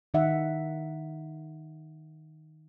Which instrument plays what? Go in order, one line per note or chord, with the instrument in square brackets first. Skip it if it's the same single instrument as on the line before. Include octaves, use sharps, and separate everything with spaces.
[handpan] D#3 D#4 E5 F#5